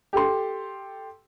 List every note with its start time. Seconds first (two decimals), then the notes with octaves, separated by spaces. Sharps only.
0.13 G4 A4 C6